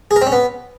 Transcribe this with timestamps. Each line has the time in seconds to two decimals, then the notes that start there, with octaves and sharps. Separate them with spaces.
0.11 G#4
0.16 A#4
0.21 C4
0.27 C#4
0.32 B3